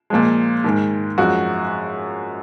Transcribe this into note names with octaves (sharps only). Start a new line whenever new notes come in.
A#2 F3 G#3
G#2 D#3 G#3
F#2 F3 G#3 F#4